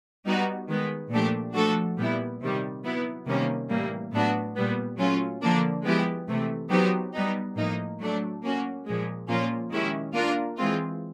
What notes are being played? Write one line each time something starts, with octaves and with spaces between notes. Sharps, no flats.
G3 B3 D#4 F#4
D#3 G#3 B3
A#2 F3 A3 D4 G4
F3 A3 D4 F#4 A4
A#2 G3 B3 E4
C3 D#3 G3
F#3 B3 E4
C3 D#3 G3 A#3 C#4
A2 E3 G3 A#3
A2 F#3 B3 D4 F#4
A#2 G3 B3
F#3 A3 C#4 F4
D3 F3 A#3 D4
F3 G#3 B3 E4 G4
C3 E3 A3
F#3 B3 D#4 G4 C5
G3 B3 D#4
A2 F3 A#3 D#4
F#3 A3 D4
A#3 C#4 F#4
A#2 F3 G#3
A#2 F3 A#3 C#4 F4
D#3 G#3 C#4 E4 G4
A#3 D4 F4 A#4
E3 G#3 C4 F4